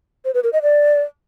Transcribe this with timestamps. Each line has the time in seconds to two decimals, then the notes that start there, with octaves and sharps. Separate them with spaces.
0.25 C5
0.34 B4
0.44 A#4
0.53 D#5
0.62 D5